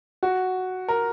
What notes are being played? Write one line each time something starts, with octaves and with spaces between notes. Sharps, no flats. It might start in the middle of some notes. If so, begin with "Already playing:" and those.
F#4
A#4